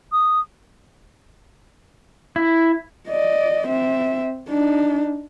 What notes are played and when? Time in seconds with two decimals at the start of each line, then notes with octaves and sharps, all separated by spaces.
0.12 D#6
2.36 E4
3.09 D5 D#5
3.67 C4 E5
4.49 D4 D#4